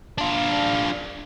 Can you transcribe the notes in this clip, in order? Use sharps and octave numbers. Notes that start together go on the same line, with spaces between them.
D4 F4